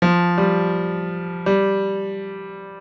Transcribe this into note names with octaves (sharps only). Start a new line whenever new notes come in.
F3
G3
G3